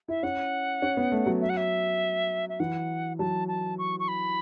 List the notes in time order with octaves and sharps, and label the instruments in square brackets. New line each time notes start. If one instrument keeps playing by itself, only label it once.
[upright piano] E4 [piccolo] E5
[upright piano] C#4 [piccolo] F#5
[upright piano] C#4
B3
A3
F#3
[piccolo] E5
F#5
E5
E5
[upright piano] E3 [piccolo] F#5
[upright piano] F#3 [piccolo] A5
[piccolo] A5
C#6
C#6
B5